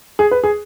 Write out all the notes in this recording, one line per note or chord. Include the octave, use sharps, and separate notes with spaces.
G#4
B4
G#4